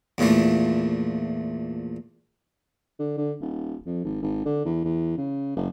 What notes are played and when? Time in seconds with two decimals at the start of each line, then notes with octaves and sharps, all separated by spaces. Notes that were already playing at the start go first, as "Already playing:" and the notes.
0.18 E2 A#2 E3 F3 A3
2.99 D3
3.17 D3
3.41 D#1
3.86 F2
4.05 G#1
4.22 G#1
4.46 D3
4.65 E2
4.85 E2
5.17 C#3
5.56 F#1